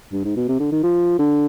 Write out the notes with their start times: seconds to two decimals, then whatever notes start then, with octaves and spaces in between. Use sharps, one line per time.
0.12 G2
0.25 G#2
0.36 B2
0.49 C3
0.60 D3
0.72 D#3
0.83 F3
1.19 D3